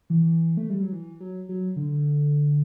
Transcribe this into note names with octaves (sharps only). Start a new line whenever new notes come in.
E3
A3
G3
F#3
E3
F#3
F#3
D3